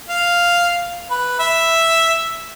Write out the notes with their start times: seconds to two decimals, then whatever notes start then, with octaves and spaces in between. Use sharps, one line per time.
0.08 F5
1.11 B4
1.40 E5